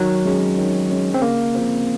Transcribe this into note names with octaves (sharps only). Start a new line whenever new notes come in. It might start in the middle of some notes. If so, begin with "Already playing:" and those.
Already playing: D#3 F#3
G#3 C#4
D#3
G#3 C#4
C4
C#3 A#3
F3 C4